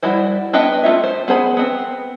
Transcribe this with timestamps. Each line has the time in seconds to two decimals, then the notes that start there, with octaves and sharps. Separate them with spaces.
0.03 G3 E4 F#4 C5
0.53 B3 D4 B4 D#5 G5
0.83 A3 D#4 F4 E5
1.04 C5
1.28 B3 G#4 C5 B5
1.57 B3 C4